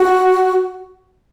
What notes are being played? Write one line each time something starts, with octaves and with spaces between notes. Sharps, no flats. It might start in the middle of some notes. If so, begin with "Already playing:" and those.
Already playing: F#4